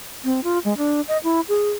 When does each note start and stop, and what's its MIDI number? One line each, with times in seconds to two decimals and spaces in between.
0.24 0.40 60
0.44 0.59 65
0.65 0.76 56
0.77 1.01 62
1.08 1.18 75
1.24 1.41 64
1.48 1.71 68